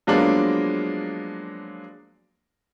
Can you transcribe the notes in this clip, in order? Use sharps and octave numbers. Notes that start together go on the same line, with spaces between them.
F3 F#3 G#3 A#3 B3 D4